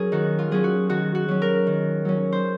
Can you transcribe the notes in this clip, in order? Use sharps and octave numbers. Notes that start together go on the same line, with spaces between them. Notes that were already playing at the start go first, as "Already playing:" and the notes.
Already playing: F#3 C#4 G#4 A#4
D#3 F#4
F4
F#3 C#4 G#4
F#4
D#3 F#4
F#4
F#3 C#4
A#4
D#3
F#3 C#4
C5